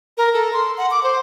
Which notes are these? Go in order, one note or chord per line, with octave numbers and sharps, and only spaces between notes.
A#4
A4
C6
F#5
D6
C5